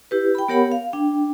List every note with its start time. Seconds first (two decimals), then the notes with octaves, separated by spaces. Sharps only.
0.11 E4 G4 B4
0.35 G5 B5
0.48 B3 G4 A#4 C#5 F#5 B5
0.72 F5
0.93 D4 G5